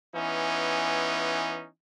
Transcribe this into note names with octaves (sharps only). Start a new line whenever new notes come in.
E3 B3 C#4 D#4